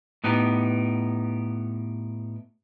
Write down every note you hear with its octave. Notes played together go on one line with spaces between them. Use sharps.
A2 B3 D#4 G4